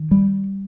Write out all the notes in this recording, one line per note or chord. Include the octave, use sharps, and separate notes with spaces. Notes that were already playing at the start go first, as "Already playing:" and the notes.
Already playing: D#3
G3